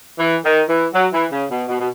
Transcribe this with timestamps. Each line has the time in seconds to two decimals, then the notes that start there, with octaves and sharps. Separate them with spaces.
0.18 E3
0.44 D#3
0.68 E3
0.93 F#3
1.12 E3
1.31 C#3
1.50 B2
1.68 B2
1.79 B2